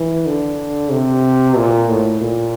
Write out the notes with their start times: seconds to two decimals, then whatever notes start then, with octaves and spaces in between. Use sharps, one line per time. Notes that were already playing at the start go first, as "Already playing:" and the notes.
Already playing: E3
0.26 D3
0.91 C3
1.57 A#2
1.89 A2
2.21 A#2